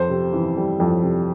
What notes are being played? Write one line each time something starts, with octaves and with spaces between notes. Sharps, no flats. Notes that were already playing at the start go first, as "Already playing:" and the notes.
Already playing: F2 C5
C3
E3
G3
F2
C3